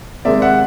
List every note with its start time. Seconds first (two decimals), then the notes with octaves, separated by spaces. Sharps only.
0.25 C3 D#3 G#3 D5 E5
0.42 E5 F#5